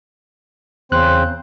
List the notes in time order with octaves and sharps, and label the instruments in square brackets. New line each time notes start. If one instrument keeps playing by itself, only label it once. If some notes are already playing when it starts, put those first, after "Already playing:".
[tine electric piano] E2 F#6 [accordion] C#3 C4 C5